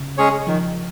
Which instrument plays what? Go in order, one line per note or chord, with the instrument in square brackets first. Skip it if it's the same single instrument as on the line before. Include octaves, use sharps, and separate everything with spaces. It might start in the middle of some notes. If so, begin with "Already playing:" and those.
Already playing: [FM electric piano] C#3
[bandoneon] G#3 C#4 G#4 C#5
[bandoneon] D#3 [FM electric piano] F3